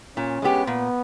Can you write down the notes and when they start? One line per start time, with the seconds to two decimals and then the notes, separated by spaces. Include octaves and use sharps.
0.17 A#2 C#4
0.42 G#3 B3 G4
0.67 A#2 B3